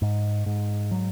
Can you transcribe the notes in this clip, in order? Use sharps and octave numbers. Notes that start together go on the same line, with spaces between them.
G#2
G#2
F#3